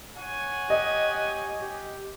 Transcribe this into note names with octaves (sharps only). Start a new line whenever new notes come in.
C#5 F#5 G#5
G4 D#5
G4